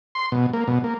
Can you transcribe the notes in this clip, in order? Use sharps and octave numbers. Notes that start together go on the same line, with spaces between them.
C6
B2
A#3
B2
A#3